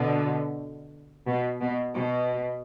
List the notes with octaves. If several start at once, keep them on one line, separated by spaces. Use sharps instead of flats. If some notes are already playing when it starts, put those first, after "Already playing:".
Already playing: B2 D3
B2
B2
B2